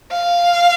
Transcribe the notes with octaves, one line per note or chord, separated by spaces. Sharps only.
F5